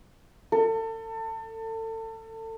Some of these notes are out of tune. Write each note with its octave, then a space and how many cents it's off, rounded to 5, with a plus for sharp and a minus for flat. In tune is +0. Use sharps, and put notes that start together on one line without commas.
A4 +30